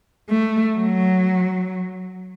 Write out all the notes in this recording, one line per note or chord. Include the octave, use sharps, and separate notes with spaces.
A3
F#3